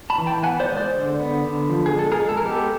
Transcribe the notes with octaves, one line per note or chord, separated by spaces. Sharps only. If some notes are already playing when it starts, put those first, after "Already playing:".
A5 B5
E3
G5 A5
B3 F#5 G#5
C5 D5
G#3
C5 D5
D3
B3
D3
F3
G#4
G#3 A4
G#4 A#4
G#3
A4
A#4
B3 G4 A4